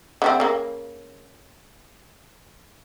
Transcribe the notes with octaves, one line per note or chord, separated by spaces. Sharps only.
D3 A3 C4
C#3 A#3